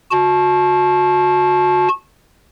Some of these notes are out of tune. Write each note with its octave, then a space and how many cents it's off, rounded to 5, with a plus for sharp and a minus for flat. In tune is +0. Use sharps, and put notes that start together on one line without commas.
F#4 -30 A5 -20